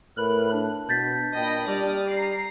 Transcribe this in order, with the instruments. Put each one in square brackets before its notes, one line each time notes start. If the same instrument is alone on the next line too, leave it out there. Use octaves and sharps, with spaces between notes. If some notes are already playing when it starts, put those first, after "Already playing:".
[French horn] A2 [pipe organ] A#4 B4 B5
[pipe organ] D4
[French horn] B2 [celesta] G6 A6 B6
[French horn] A#2 [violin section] D#5 G5 B5
[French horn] G3 [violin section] D5 D#6 F6
[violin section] A#5 C7